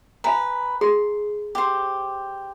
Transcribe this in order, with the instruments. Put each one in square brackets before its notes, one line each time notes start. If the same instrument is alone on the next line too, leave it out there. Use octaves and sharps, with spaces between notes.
[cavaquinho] B4 [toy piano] F5 G#5 A#5
[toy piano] G#4 [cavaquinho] C6
[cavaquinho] G4 C5